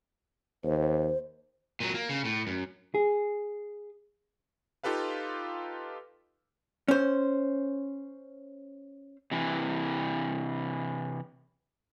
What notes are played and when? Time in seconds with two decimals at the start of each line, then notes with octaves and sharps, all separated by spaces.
0.64 D#2 C5
1.80 A#2 F#3
1.94 A#3
2.09 C#3
2.25 A2
2.47 F#2
2.95 G#4
4.83 D#4 F4 G4 A4 B4 F5
6.88 C#4 C5
9.31 C3 E3